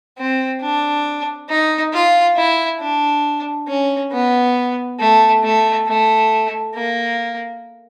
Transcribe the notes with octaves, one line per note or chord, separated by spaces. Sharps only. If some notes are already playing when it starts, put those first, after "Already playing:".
C4
D4
D#4
F4
E4
D4
C#4
B3
A3
A3
A3
A#3